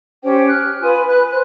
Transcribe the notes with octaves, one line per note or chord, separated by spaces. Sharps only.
C#4 G4 C5 G5
F6 F#6
F4 B4 G#5 D#6
B4 F#6
C5 F#6